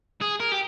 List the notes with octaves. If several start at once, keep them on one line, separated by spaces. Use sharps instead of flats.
G#4
A#4
G4